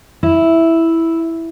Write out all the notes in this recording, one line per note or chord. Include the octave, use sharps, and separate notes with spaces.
E4